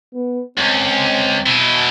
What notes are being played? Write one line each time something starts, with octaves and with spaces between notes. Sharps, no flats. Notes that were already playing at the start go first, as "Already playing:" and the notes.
B3
C#2 C4
B2 E4